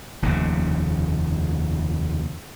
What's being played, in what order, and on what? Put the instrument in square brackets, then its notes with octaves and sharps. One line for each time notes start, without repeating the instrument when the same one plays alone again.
[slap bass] F1 D#2 A#2 C#3